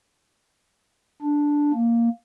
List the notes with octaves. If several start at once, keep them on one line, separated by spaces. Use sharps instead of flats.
D4
A#3